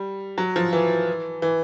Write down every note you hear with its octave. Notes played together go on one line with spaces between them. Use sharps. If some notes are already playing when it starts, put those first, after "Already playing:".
Already playing: G3
F#3
F3
E3
E3